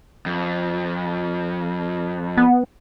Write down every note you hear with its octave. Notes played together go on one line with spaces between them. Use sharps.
F2
B3